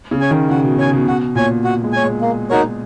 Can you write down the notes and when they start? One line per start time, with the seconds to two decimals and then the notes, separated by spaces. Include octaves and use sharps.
0.11 C#3
0.21 C#5 G#5
0.31 D#3
0.49 C#3 F#4
0.63 B2
0.78 C#3 C#5 G#5
0.93 B2
1.07 B2 F#4
1.35 A#2 C#5 G#5
1.64 F#4
1.83 G#3
1.92 C#5 G#5
2.03 G#3
2.21 A#3
2.50 D#4 F#4 A#4 C#5